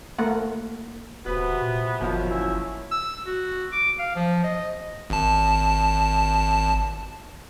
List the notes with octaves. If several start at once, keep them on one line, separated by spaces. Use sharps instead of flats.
A3 A#3 F#5
D1 C3 B3 F#4 B4
A#2
G1 D#2 F3 F#3
C#4 E4 E5
E6
F#4
D6
F5
F3
D#5
G#1 A5